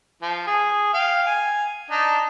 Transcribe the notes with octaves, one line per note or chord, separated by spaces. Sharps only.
F3
G#4
F5 G5
G#5
D4 D#4